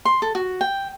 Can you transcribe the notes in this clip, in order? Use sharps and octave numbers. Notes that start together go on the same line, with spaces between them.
C6
A4
F#4
G5